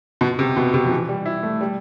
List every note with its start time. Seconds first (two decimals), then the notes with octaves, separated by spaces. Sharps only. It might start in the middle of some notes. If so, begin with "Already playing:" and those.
0.21 B2
0.39 C3
0.56 B2
0.74 C3
0.85 F3
0.91 E3
1.09 G3
1.26 E4
1.43 A3
1.61 G3